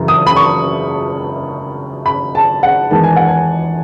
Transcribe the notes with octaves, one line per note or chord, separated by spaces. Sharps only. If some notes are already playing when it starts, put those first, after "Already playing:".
Already playing: F#2 C#3 E3
D#6
B5
C#6
B5
A5
F#5
E2 D#3 G#3 A5
G#5
F#5
G#5